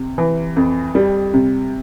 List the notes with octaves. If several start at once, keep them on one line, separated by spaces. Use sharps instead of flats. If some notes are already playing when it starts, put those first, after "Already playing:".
Already playing: C3
E3
F2
G3
C3